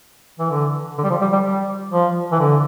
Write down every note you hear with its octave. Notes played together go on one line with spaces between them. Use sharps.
E3
D3
D3
G3
F3
G3
G3
G3
F3
E3
D3